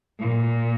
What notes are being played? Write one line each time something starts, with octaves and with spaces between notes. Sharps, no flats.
A#2